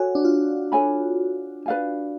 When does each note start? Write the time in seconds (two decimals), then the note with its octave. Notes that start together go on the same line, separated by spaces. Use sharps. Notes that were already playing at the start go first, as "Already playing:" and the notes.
Already playing: F#4 A4 C#5 G#5
0.15 D4
0.25 F4
0.72 A4 C#5 G#5 B5
1.66 B4 D5 F5 G#5